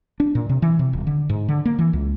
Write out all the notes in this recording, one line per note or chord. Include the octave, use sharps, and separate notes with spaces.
D4
A#2
C3
E3
C3
D#1
D3
G#2
D3
A#3
E3
C#2